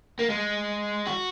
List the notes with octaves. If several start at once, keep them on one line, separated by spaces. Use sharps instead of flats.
A#3
G#3
F#4